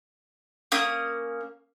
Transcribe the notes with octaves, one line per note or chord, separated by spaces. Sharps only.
A#3 C#4 D#6